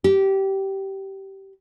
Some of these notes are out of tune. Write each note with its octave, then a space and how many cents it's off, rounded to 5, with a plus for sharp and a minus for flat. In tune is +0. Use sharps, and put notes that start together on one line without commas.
G4 -20